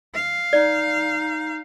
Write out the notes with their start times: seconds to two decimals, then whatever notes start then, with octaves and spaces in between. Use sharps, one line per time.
0.14 F5
0.53 D#4 D5